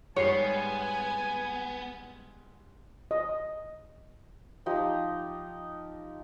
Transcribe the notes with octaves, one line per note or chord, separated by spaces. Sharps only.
G#2 G3 B3 C#5 G#5 C7
D#5
F3 D#4 G4